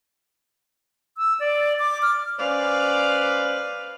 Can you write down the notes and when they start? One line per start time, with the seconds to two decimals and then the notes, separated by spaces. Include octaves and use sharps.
1.18 E6
1.40 D5
1.79 D6
2.02 F6
2.39 C#4 B4 C5 D5 F5